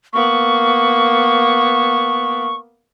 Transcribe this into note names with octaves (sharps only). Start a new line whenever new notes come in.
A#3 B3 C#6